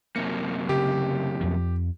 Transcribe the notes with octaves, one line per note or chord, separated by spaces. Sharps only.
F#2 C3 A#3 C#7
C#3 G4
F2 F3